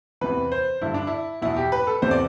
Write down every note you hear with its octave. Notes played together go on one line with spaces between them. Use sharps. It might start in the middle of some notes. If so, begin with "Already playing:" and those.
E2 C3 E3 B4
C5
G2 D3 E4
D4
E4
E2 B2 E4
G4
B4
A4
E2 C3 E3 C5
D5